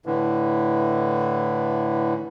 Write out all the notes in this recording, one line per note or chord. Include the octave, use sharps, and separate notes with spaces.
A2 D3 E3